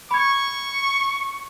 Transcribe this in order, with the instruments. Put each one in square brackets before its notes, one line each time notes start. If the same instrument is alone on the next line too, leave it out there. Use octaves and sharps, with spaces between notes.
[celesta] B5 G#6 [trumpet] C#6